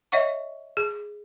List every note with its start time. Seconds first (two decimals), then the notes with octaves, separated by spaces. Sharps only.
0.12 C#5 D#5 E5 F#5 C#6
0.77 G#4